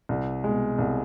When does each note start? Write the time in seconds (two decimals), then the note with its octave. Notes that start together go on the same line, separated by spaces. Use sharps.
0.09 C2
0.44 B2 G#3
0.79 C2